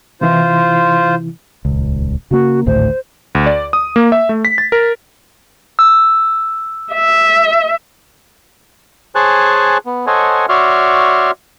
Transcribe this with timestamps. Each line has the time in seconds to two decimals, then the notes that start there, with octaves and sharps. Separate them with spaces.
0.21 C3 E3 E4 F4 C5
1.65 D#1 C#2
2.31 C#3 A#3 F#4
2.66 G#1 D2 A2 C5
3.35 D2
3.46 D5
3.73 D#6
3.96 A#3
4.12 E5
4.29 A3
4.45 B6
4.58 A6
4.72 A#4
5.79 E6
6.93 E5
9.15 G#4 C5 C#5 G#5 A5 F#6
9.86 B3
10.07 A4 C5 C#5 D#5 F#5 G#5
10.49 F#4 C#5 D5 E5 C6 F6